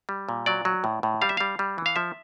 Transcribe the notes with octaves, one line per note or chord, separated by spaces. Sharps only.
G3
A#2
F#3 D5
F#3
A2
A2
G3 F5
E5
G3 F5
G3
E3
F5
F3 E5